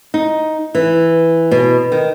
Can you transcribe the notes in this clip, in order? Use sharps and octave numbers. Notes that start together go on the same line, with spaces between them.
D#4
E3
B2
D#3